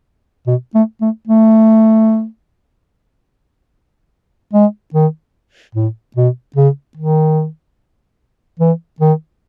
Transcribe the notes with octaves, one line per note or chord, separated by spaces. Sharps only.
B2
A3
A3
A3
G#3
D#3
A2
B2
C#3
D#3
E3
D#3